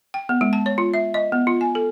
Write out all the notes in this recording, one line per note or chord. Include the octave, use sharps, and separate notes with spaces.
G5
B3
G#3
A5
C#5
F4
E5
D#5
B3
F4
G#5
A4